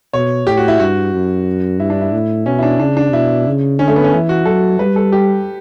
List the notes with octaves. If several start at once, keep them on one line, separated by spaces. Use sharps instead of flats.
B2 C#5
A2 G4
F#4
E4
G2 F#4
F#2
G2 E4
D4
E4
A2
B2 C#4
E4
D4
C#3 D4
D4
B2 E4
C#3
D3 C#4
A3
B3
C#4
E3 E4
F#4
F#3 A4
G3 B4
A4
G4